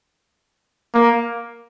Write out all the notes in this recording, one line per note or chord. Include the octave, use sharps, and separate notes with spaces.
A#3